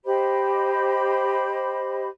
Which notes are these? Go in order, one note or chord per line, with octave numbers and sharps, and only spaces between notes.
G4 C5 D#5 B5